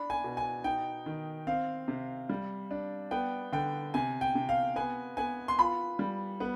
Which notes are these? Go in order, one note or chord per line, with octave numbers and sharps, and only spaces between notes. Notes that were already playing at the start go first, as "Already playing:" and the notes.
Already playing: D4 B5
G#5
B2
G#5
D#4 G5
D#3
C4 F5
C3
G3
D4
B3 G5
D3 G5
C3 G#5
G5
C3
F5
B3 G#5
B3 G#5
C6
F4 B5
G3
B3